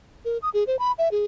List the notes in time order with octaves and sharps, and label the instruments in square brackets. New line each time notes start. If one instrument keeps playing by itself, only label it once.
[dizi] A#4
D#6
G#4
C5
B5
E5
G#4